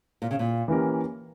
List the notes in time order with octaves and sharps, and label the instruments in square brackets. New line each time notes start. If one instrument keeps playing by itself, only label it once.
[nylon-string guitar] A#2
C#3
A#2
[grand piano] E3 A#3 C#4 G4 A#4